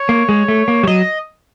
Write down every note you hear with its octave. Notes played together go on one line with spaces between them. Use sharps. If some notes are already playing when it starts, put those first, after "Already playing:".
Already playing: C#5
A#3
G#3
A3
A#3
G3
F#3 D#5